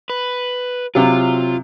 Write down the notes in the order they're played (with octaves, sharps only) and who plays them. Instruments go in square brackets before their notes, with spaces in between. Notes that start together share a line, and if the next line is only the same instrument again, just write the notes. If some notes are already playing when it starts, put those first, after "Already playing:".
[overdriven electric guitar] B4
[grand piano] C3 F#3 [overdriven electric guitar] F4